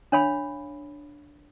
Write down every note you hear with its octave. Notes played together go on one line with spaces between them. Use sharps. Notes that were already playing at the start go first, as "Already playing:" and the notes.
D4 C#5 F5 B5